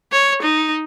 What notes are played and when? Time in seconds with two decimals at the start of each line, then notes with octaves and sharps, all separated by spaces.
0.12 C#5
0.43 D#4